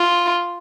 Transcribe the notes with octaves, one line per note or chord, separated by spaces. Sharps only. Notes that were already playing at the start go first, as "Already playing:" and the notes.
Already playing: F4